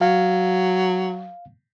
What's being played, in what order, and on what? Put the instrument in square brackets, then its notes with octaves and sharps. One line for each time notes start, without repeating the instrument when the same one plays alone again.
[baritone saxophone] F#3 [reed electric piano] F5